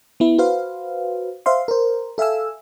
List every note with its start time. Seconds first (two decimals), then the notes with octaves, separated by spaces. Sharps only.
0.20 B3 E4
0.38 F#4 B4 C5 F5
1.46 C5 E5 F5 C6
1.68 A#4 C5
2.18 A4 E5 F5 G#5 E6